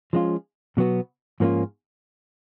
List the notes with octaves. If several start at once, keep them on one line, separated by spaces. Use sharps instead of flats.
F3 G#3 C#4 F4
B2 F#3 B3 F#4
G#2 F3 A#3 C#4 F4